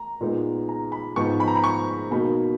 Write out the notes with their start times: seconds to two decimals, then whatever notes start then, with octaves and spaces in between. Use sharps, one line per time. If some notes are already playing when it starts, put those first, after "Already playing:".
Already playing: A#5
0.21 A#2 G#3 B3 D#4
0.69 A#5
0.92 B5
1.16 G#2 F3 B3 D#4 C#6
1.40 B5
1.48 A#5
1.55 B5
1.64 C#6
2.11 B2 A#3 D#4 B5